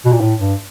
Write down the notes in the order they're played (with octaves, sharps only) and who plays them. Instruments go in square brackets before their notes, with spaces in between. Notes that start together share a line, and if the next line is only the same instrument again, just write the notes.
[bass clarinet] B2
A#2
A2
G2